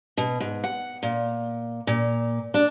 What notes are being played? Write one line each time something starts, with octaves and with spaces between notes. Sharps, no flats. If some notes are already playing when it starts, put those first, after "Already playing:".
B2
G#2
F#5
A#2
A#2
D4